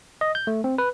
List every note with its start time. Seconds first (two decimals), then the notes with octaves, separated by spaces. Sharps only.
0.21 D#5
0.35 G6
0.47 A3
0.64 C4
0.78 B4